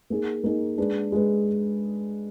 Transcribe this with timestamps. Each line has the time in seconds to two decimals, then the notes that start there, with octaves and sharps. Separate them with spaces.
0.10 A#3 D#4 G#4
0.44 A#3 D#4 G#4
0.77 G#3 D4 G#4 B4
1.12 G#3 D4 G#4 B4